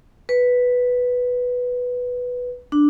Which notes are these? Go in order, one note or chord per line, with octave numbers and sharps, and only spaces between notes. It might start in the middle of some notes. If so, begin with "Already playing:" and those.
B4
D4